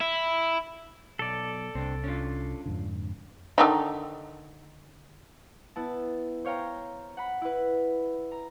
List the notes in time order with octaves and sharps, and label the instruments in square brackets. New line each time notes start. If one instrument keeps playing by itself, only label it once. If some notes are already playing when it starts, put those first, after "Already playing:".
[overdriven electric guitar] E4
[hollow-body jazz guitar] B1 [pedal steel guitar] A4 D5
[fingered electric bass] C2 [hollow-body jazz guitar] C4 D4
[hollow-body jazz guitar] C#4 D4 F4
[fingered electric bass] F2 G#2 D3
[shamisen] D3 D#3 D#4
[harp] B3 E4 A5
C5 C#5 F5 G5 A#5
F#5 B5
E4 B4
A#5